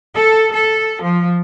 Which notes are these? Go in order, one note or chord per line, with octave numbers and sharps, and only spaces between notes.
A4
A4
F3